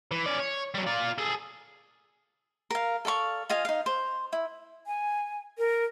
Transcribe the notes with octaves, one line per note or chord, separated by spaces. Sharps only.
E3
C#4 D5
C#5
F#3 G3
F4 D5
G#4 A4
A#4 F5
A4 D5 F5 C#6
F4 D#5 F5 G#5
D#4 F5
C5
E4
G#5
A#4